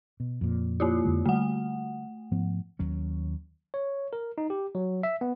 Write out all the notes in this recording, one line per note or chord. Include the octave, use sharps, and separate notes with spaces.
B2
F2 A#2
A#3 E4 F4
F2 D3 G#3
D3 G3 A3 F#5
G#2 F3 B3
D#2 F#3 C#4
C#5
A#4
D#4
G4
F#3
E5
B3